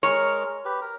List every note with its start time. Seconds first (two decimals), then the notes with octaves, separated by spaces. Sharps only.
0.03 G#3 A#4 C#5
0.65 G4 B4
0.81 A#4